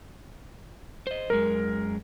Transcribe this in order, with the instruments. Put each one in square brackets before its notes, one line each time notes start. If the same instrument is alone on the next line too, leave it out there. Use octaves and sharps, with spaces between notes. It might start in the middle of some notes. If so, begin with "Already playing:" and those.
[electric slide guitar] C5 D#5
[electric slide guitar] F#2 G#3 [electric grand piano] A#4